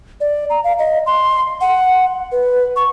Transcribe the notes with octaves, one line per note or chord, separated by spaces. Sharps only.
D5
A#5
F5
D#5
C6
F#5
B4
C#6